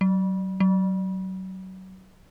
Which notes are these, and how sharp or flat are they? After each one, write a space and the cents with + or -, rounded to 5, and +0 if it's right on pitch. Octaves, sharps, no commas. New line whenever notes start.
F#3 +30
F#3 +25